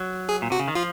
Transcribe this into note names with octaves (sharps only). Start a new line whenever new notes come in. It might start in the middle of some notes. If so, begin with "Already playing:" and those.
Already playing: F#3
G#4
A#2
C3 F#4
C#3
D#3
F3 F4